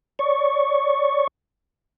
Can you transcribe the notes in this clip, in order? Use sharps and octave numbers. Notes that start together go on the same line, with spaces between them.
C#5 D5 C#6